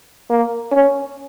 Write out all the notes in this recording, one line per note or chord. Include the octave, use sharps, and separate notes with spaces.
A#3
C#4